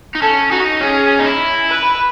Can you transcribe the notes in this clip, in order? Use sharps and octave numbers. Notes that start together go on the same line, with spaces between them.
D#4
C#4 A4
D#4 F#4
C#4 G#4
D#4
E4
B4